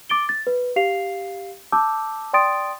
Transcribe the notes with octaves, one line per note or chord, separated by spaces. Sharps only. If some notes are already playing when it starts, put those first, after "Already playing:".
D6 A6 D7 G7
A6
B4
G4 F5 C7 F7
A5 D6 E6 G6
D5 G5 C6 D#6 A6 D7